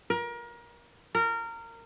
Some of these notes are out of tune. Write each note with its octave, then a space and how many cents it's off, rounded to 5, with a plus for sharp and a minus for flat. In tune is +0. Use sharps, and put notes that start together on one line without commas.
A#4 +30
A#4 -20